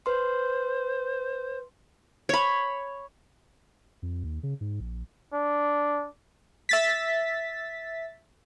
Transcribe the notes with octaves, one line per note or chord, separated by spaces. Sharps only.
B4 C5 C6
C#5 B5
F2
D#2
C#3
G#2
A#1
D4
E5 A6 B6